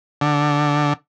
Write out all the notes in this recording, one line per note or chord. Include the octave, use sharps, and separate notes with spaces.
D3